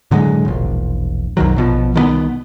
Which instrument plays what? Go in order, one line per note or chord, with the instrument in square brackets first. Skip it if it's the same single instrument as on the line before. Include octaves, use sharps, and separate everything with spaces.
[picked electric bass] A2 D3 F#3 G#3
E1 A#1
B1 F2 D#3 F#3
A#1 B2 F3
C2 D#3 G3 B3